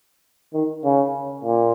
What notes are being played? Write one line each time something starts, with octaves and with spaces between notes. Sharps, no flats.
D#3
C#3
A#2